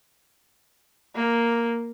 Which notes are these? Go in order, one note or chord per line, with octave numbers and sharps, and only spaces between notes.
A#3